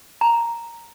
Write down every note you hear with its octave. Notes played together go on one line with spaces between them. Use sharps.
A#5